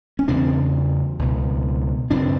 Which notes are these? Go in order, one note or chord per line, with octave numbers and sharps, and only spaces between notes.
C#4
E2 C#3 C4 D4
C#2 B2
F#2 C#3 C4 D4